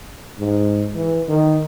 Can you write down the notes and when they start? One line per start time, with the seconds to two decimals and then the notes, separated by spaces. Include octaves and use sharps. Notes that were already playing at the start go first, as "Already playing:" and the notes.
0.39 G#2
0.95 E3
1.28 D#3